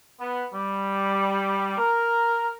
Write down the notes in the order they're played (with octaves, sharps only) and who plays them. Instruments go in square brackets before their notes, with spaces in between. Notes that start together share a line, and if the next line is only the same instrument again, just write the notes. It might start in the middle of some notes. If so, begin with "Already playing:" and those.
[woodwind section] B3
G3
A#4